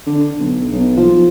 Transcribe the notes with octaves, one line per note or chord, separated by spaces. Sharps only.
D3
B1
B1
F3